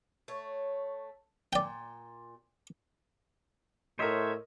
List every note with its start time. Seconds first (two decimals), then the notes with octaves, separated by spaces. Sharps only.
0.28 A3 C#5
1.53 A#2 D5 G5
3.99 A2 A#4 C5 C#5 D#5 E5